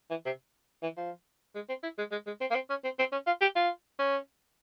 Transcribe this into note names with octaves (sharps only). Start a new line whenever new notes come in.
E3
C3
E3
F3
G#3
C4
E4
G#3
G#3
G#3
C4
A#3
C4
C#4
C4
C4
C#4
F4
G4
F4
C#4